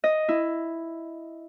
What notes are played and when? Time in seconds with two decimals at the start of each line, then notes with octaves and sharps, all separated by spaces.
0.04 D#5
0.29 E4